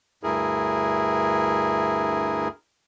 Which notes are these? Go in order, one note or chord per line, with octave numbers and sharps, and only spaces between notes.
D2 G2 E4 G#4 A#4